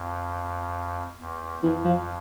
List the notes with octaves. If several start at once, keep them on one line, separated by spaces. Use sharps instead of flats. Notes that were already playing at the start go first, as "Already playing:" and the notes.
Already playing: F2
E2
F2 E3
F3